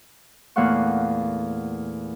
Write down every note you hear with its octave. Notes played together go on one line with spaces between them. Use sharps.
E2 A#2 A3 F5 F#5 C#6